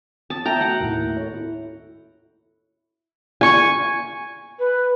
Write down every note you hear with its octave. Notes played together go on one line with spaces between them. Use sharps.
A5 D#6
A3 E5 G5 A5 A#5
F#4 E5 F#5
D#2 A2
A4 C#5
E4
G#5 C#6
B4